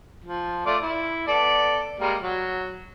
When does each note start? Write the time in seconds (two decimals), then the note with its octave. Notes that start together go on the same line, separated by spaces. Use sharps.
0.24 F3
0.66 A3 F4 D5
0.83 E4
1.28 B3 A4 D5
2.00 G3 G#3 A#3
2.21 F#3